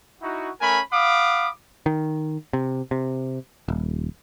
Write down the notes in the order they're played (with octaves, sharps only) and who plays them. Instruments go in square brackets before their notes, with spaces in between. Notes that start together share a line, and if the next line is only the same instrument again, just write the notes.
[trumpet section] D#4 E4 F#4
A3 C#4 A#4 G#5 B5
F5 F#5 B5 D6 D#6
[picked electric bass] D#3
C3
C3
D#1